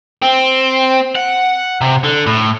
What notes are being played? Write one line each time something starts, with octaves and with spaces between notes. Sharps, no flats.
C4
F#5
C3
D3
A2